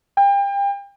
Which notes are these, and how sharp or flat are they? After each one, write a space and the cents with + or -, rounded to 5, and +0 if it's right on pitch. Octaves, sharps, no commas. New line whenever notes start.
G5 +35